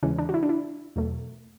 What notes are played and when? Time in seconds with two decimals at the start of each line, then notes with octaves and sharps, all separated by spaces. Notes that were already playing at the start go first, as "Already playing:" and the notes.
0.03 E2 C#3 E3 G#3 C#4
0.19 D4
0.29 F#4
0.34 E4
0.43 D4
0.49 E4
0.96 E2 B2 F#3 A3